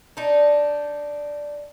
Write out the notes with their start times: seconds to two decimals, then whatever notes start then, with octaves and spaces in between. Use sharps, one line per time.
0.17 D4 D#4